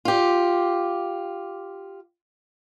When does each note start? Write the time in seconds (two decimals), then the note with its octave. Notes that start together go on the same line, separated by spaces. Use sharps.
0.05 F4 G4